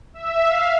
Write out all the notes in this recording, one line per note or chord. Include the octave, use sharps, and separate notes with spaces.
E5
F5